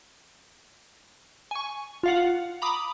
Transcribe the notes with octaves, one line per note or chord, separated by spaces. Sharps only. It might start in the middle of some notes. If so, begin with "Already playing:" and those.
G#5 C#6
F4 F5 F#5
A#5 B5 D6 D#6